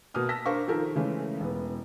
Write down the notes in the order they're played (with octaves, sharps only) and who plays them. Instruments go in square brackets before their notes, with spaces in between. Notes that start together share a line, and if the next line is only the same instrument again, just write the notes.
[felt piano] B2 A#3 D#6 F6
A5 E6 A#6 B6
D4 A#4 C5 F5 C#6
D#3 F3 A4 A#4
C#3 E3 G#3 A3 C#4
E1 B3